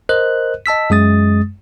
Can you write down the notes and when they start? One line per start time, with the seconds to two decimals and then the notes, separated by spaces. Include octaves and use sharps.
0.09 A#4 C5 D#5 F#6
0.66 D#5 A5 E6 B6
0.90 F#2 G#3 D#6 A6